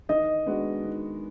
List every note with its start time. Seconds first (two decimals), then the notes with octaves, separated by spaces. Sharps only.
0.09 D#3 D#5
0.46 G#3 B3 D4 F#4
0.84 D#3